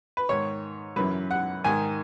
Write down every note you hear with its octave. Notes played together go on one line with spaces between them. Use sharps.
B4
G#2 D#3 C#5
F#2 C#3 E3 B4
F#5
G#2 D#3 G#5